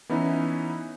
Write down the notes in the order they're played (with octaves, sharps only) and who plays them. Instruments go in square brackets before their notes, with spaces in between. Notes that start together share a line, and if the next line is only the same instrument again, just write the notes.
[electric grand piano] E3 B3 C#4 D#4 E4